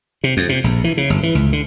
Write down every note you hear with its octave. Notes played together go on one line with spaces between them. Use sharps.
C3
F2
C3
A#1
E3
C#3
G1
E3
C#2
D3